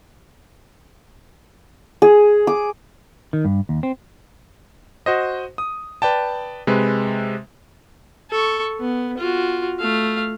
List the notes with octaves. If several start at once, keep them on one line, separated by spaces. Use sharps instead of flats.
G#4
D6
D#3
G2
D#2
C4
F#4 C5 D#5
D#6
B4 D5 G5 A5
C3 G#3 B4
A4 C#6
B3
F4 F#4
A3 F5